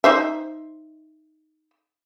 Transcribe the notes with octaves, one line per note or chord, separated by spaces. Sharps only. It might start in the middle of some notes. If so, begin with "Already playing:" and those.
D#4 C5 E5